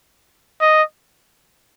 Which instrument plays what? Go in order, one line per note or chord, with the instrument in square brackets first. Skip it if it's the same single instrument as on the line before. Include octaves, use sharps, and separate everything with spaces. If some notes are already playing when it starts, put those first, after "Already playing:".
[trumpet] D#5